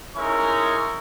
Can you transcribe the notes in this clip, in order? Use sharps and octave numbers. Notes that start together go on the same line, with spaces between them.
G#3 C#4 D#4 E4 A#4 C#6